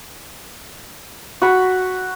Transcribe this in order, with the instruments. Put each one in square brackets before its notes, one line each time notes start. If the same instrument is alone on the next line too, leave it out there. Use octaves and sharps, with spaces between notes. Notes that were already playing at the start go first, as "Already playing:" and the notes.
[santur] F#4 B5 C#6